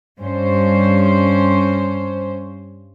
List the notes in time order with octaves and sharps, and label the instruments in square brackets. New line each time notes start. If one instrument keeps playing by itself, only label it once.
[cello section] G2 C#4 C5